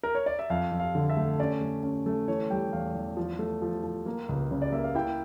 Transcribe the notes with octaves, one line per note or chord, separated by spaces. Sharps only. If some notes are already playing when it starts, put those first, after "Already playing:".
A#4
C#5
D5
E5
F2 F5
F2
F5
D3
E5
A3
C#4 D5
A3
C#4
A3
E3 C#5
G3 G5
E2 F5
E2
F3
A3
F3
F3
A#3
C#2
C#3
D5
A#3 E5
F5
E4 G5